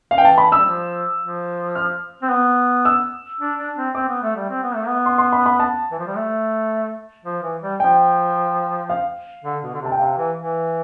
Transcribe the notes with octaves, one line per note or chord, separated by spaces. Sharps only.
E3 F5
G5
A5
B5
E6
G3
F3
F3
F6
C4
B3
E6
D4
D4
C4
C4 D6
B3
A3
G3
C4
B3
A3
B3
C6
C6
B5
B5
A5
E3
F3
G3
A3
F3
E3
G3
F3 G5
F5
D3
B2
D3
C3 A5
G5
C3 F5
E3
E3